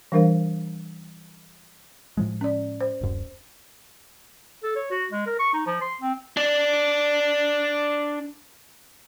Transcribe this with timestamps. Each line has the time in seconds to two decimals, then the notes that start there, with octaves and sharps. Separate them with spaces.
0.12 E3 G3 D4 A#4 C5 F5
2.17 A2 F3 G#3
2.41 C#4 D5
2.81 C5
3.01 D1 F#2
4.63 A4
4.75 C#5
4.91 F#4
5.11 G#3
5.26 A#4
5.39 C#6
5.54 D#4
5.66 F3
5.81 C6
6.01 C4
6.37 D4 D5